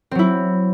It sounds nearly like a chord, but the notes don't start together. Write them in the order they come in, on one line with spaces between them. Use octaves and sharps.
C4 F#3 E4